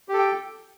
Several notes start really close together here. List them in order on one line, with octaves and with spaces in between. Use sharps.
G4 A4 G5